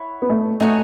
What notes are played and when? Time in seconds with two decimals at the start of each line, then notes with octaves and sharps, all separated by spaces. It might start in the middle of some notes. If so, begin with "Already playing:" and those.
Already playing: E4 C#5 F#5
0.22 B3
0.30 A3
0.60 A3 D#4 F#4 C#5 G#5